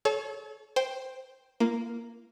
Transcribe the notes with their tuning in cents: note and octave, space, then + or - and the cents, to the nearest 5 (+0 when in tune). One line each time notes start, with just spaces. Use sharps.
A4 -35 C#5 +5
C5 +0 G5 +0
A#3 +0 F4 -40